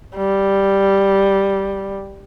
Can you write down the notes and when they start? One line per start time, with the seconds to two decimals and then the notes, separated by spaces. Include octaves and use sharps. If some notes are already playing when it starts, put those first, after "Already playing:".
0.16 G3